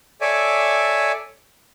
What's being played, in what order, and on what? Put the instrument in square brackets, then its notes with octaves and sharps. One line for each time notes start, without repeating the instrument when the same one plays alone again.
[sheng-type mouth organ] A4 C#5 D5 E5 G#5